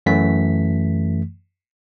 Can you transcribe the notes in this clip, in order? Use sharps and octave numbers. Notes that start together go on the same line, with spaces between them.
F#2 E3 A3 B6